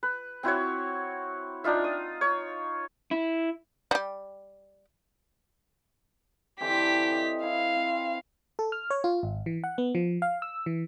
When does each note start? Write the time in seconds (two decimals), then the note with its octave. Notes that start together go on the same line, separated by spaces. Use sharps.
0.03 B4
0.43 C4 E4 F#4 C#5
1.64 D4 D#4 F4 E5
1.84 D#6
2.21 C#5
3.11 E4
3.91 G3 G4
6.60 D3 E3 C4 G4 B6
7.12 D#5
7.43 E4 F5
7.76 C4
8.59 A4
8.72 F6
8.90 C#5
9.04 F4
9.23 G#1
9.46 E3
9.64 F#5
9.78 B3
9.95 F3
10.22 F5
10.42 E6
10.66 E3